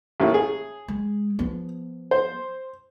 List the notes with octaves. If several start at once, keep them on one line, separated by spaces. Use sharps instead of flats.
A1 A2 A#3
G#4
G#3
F3 B3
C5